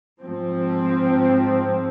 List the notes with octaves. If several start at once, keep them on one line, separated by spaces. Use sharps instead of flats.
G#2 F3 C4